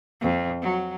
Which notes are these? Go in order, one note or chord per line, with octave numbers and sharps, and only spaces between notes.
F2
F#3